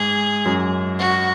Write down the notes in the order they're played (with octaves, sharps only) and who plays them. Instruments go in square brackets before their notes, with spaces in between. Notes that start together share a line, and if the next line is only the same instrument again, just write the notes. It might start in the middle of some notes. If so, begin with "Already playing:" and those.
Already playing: [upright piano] G#2 [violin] G#4
[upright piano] F#2
[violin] F#4